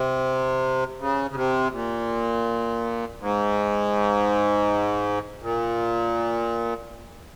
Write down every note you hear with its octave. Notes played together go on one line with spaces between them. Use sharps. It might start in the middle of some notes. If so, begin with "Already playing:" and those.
Already playing: C3
C#3
C#3
C3
A#2
G#2
A#2